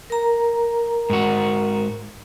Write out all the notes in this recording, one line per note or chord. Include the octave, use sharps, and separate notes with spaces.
A#4 A#5
G#2 F#4